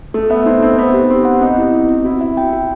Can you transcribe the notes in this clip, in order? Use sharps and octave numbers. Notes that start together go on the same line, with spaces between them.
A3 A4
B3 E5
C4 D#4
C4 D#4
B3 C5
G4
C4 G4
F#5
C4 D#4
E4
C4
C4
E4 F#4
E5
G5
F#4